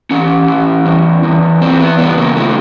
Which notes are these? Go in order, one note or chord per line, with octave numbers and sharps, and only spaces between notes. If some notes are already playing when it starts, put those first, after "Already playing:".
E3 C#4
E3
E2
E2
E3 C4
B3
C#3 B3
A#3
F3 A3